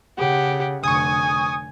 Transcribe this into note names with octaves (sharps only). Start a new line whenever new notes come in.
C#3 G4 F#5
F1 D3 G#5 C#6 D#6